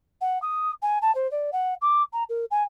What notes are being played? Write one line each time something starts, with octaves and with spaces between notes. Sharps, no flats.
F#5
D#6
G#5
A5
C5
D5
F#5
D6
A#5
A#4
G#5